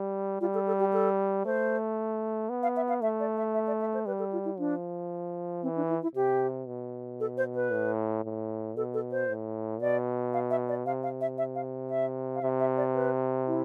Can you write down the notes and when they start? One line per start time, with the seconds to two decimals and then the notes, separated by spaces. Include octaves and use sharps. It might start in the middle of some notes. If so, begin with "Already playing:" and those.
Already playing: G3
0.41 G3 F4
0.54 A4
0.67 A4
0.80 G4
0.93 A4
1.45 A3 C5
2.49 B3
2.63 F5
2.77 E5
2.89 F5
3.01 A3 E5
3.20 D5
3.37 E5
3.54 E5
3.67 D5
3.81 E5
3.94 C5
4.06 G3 B4
4.19 A4
4.33 F4
4.45 E4
4.59 F3 D4
5.63 E3 C4
5.76 D4
5.89 E4
6.02 E4
6.15 C3 G4
6.67 B2
7.20 A4
7.37 C5
7.55 B4
7.72 A2
8.24 A2
8.77 B2 A4
8.94 A4
9.11 C5
9.29 A2
9.81 B2 D5
10.34 F5
10.51 E5
10.69 D5
10.85 C3 F5
11.03 F5
11.21 E5
11.38 E5
11.55 F5
11.90 E5
12.35 F5
12.42 C3 E5
12.60 E5
12.77 D5
12.95 B4
13.47 E4